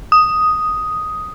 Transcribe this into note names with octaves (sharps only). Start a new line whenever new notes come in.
D#6